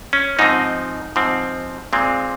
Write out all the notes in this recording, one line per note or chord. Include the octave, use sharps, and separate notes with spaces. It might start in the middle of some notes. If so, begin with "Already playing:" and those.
C#4
G#2 F3 C4 D#4
G#2 F3 C4
A#2 G#3 C4